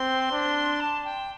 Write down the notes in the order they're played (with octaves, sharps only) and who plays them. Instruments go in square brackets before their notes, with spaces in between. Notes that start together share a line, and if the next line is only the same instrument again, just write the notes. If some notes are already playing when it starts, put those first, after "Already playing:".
Already playing: [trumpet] C4 [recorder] C6
[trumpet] D4
[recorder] A5
G5